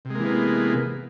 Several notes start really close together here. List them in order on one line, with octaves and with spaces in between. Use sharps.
C3 G#3 A#3 E3 B3